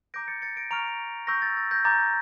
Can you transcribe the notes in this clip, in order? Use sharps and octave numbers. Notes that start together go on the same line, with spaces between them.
A#5 D6 G6 A#6 D7
A6 C#7
A6 C#7
A#6 D7
A#5 C#6 F6 D7 F7
C#6 E6 G6 A#6
A6
A6
G6 A#6
A#5 D6 G6 A6